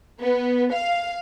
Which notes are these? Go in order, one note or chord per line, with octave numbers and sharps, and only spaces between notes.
B3
F5